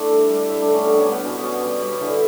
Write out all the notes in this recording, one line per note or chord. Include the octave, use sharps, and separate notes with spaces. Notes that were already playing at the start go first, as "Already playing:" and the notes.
Already playing: A3 D4 E4
G3
G3
A2 E4
D4
A2
C#4
G3 B3
C#4 D4
G3
B3
B2 C#4
B3
B2 C#4
G3
G3
D3 E4